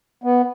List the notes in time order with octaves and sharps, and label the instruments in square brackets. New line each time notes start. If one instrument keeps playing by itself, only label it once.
[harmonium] B3